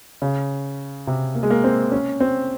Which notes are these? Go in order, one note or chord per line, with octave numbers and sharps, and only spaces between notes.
C#3
C3
A#3
G#3
A#3
C4
C#4
C4